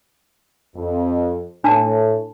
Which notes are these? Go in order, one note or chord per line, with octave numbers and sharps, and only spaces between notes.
F2
A2 D4 A5